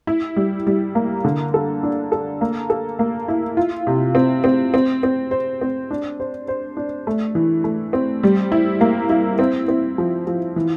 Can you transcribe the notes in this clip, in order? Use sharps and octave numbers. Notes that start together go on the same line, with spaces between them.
E4
G3
G3
A#3
D3
A4
D4
A4
A#3
A4
A#3
E4
F4
C3
C4
C4
C4
C4
C5
C4
D4
C5
C5
D4
A3
E3
A3
C4
G3
E4
A#3
E4
C4
C4
F3
F3
E3